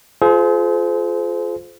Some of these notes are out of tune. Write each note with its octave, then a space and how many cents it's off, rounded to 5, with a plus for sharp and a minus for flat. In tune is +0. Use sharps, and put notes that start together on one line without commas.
F4 +0 G#4 +45 C5 -20